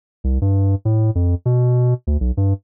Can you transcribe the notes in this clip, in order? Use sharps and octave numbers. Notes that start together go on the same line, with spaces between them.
C2
G2
A2
F2
B2
D2
B1
G2